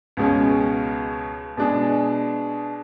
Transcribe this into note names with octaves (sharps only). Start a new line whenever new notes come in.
C#2 B2 G#3 C#4
B2 G#3 D4 G#4